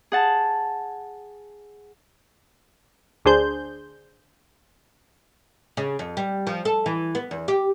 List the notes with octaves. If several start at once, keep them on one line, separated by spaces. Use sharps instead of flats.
G#4 F#5 A5
D2 D4 G#4 C5 G6
C#3
F2
G3
F3
A4
E3
B3
E2
G4